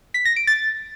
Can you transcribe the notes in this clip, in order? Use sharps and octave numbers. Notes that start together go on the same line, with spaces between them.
B6
A#6
D7
A6